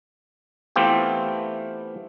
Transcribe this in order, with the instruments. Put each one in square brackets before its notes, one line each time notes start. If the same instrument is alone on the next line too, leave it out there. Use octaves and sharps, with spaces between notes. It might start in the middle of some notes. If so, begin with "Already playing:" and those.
[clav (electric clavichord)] E3 A3 B3 C4 F4 G4